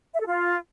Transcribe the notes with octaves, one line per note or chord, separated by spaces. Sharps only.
E5
A4
F4